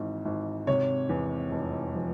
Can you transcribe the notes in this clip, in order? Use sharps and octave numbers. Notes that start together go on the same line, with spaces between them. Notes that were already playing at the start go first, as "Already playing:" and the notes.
Already playing: G#1 G#2 E3
G#1
C3 C#5
E2
F1
F3